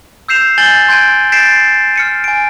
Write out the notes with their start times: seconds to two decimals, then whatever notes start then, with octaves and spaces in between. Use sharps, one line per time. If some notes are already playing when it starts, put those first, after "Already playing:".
0.28 E6 G6 C7 E7 F7
0.58 G#5 G6 A6 F#7 G7
0.88 C6 G6 G#6 D7 D#7
1.32 G6 A6 B6 C7 D7 E7
1.96 F6 C#7 D#7
2.24 G#5 D7